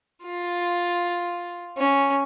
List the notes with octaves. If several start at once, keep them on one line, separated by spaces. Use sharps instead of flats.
F4
C#4